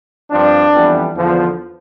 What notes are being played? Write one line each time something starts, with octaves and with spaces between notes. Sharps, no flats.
G2 F3 C4 D4
F2 E3 G3 B3
E2 D3 F3 B3